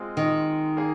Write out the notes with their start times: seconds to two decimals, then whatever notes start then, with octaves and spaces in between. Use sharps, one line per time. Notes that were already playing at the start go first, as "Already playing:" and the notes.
Already playing: G#3 C4 F4 G#4 D#5
0.17 D#3
0.77 A#3 G#4